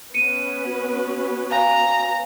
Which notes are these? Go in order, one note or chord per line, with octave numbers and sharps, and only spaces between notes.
B3 C#4 B4 C#7 D#7
F#4
F5 G#5 A#5